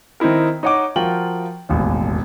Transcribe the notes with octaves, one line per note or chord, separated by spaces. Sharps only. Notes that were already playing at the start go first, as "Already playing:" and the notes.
D#3 C4 D#4 E4 A#4
D#4 C#5 D#5 F#5 D6
F3 F4 F#4 A#4 G5 F#7
E1 A1 D#2